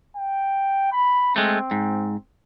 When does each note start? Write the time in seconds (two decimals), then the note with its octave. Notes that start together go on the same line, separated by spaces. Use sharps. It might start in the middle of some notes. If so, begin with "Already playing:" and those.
0.16 G5
0.92 B5
1.36 G#3 A3 C4
1.71 G#2